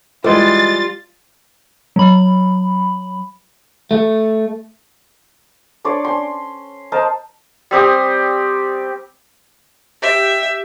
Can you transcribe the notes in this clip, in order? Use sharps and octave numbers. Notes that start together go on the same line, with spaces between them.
E3 G3 G#3 F4 A6
F#3 B5
A3
D4 C#5 D5 C6
C#4 C6
A#4 C5 D#5 A5
G3 C4 G4 D#6
G4 E5